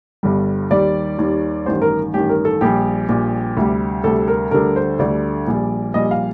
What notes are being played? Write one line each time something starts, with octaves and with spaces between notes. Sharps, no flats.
G1 G2 D3 G3
D#2 D#3 G3 D5
D#2 D#3 G3
A1 G2 D#3 C5
A#4
A1 G2 D#3 G4
A#4
A4
A#1 A#2 G3 G4
A#1 A#2 G3
D2 C3 G3
D2 C3 G3 A4
A#4
D2 D3 G3 A#4
C5
D2 D3 G3 D5
A#1 A#2 G3
A#1 A#2 G3 D#5
F5